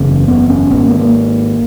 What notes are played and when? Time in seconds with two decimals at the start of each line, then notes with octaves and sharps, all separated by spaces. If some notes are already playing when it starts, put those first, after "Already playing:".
Already playing: F#1 E2 C#3
0.28 B3
0.50 C#4
0.70 G#1 G#2 B3
0.86 A#3
0.99 A#3